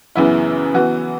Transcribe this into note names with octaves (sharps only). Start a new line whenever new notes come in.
F#2 C#3 E3 B3 E4
E3 B3 F#4